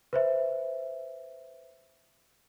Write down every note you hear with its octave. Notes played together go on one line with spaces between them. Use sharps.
B4 C5 E5